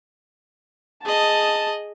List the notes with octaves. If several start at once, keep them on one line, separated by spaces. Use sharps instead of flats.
G#4 D#5 A5